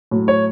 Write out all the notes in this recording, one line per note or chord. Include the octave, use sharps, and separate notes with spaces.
A2 F#3
C#5